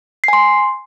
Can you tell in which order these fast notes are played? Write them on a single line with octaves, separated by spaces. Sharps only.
C7 G#5 C6